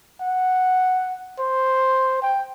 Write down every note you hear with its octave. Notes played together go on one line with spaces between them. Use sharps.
F#5
C5
G5